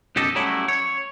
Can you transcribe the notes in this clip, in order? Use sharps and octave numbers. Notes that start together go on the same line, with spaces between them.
B1 F#2 G4 A4 D#5
F#3 G3 A3 C#4 E4
C#5